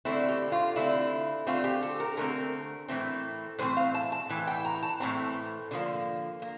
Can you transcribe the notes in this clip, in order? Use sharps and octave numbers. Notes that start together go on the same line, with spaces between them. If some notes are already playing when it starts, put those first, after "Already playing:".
D3 A3 C4 E4
G4
F4
D3 A3 C4 E4
D3 A3 C4 F4
G4
A4
A#4
D3 A3 C4 A#4
A2 E3 A3 C4
A2 E3 A3 C4 C5
F5
A5
A5
A2 E3
G5
A#5
A5
A2 E3 A3 C4 A#5
D3 F3 A#3
A#3